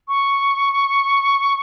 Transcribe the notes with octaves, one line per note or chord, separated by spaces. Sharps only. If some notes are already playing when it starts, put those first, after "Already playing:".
C#6